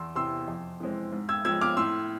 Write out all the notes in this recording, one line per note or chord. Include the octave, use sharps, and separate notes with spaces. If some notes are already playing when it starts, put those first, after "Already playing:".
Already playing: E2 C6 E6
C3 E3 C6 E6
F2
E3 G#3 C4
G#2
E6 G#6
F3 G#3 E6 G#6
D6 F6
A2 C6 E6